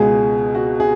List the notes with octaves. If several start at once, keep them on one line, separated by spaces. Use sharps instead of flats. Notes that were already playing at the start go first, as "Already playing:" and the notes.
Already playing: C#2 B2 G#3 G#4
F#4
G#4